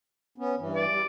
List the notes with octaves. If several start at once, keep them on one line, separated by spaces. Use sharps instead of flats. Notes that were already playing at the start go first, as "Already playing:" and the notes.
B3 C#4
G2 E3
D5
G3